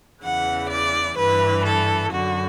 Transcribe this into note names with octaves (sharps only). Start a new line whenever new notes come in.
E2 C#3 E3 F#5
D5
G2 E3 B4
A4
F#2 D3 F#4